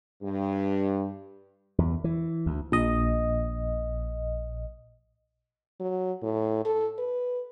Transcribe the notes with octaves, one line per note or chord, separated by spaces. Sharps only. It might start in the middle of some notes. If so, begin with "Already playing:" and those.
G2
E2
E3
D2
A#1 D#5
F#3
A2
A4
B4